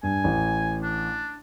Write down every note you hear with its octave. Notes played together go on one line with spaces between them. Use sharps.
G2 G#5
A1
D4